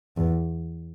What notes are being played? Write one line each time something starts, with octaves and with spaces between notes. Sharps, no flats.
E2